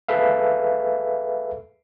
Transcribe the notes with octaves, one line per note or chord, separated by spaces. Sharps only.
G#4 A4 B4 E5 F5